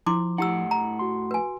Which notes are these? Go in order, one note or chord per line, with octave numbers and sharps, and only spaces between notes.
F3 E4 C6 D6
A2 E4 G4 F#5 E6
A#5
F#4 C6
B4 G#5